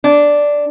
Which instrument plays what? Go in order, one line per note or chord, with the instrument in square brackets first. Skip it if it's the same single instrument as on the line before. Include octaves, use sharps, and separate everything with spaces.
[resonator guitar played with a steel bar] D4